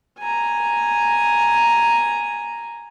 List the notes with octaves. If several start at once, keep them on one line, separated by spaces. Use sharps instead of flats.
G#5 A#5